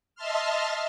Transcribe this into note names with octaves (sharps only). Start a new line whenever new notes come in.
D#5 E5 A5 C6 F6